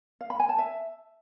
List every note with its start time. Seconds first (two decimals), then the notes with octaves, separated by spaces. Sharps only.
0.21 F5
0.30 B5
0.40 G#5
0.49 A5
0.58 E5